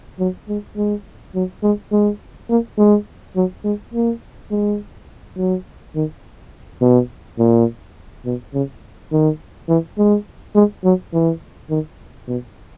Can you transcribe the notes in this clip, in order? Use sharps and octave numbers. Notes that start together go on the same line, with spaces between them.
F#3
G#3
G#3
F#3
G#3
G#3
A#3
G#3
F#3
G#3
A#3
G#3
F#3
D#3
B2
A#2
B2
C#3
D#3
E3
G#3
G#3
F#3
E3
D#3
B2